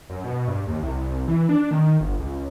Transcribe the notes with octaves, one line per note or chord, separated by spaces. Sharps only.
F#2
B2
G2
D#2
C2
E3
D4
D#3
G1
C#2